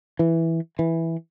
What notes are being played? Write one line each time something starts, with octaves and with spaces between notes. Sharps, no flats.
E3
E3